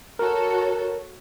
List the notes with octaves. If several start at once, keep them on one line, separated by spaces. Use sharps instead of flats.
F#4 A4 A#4 C#5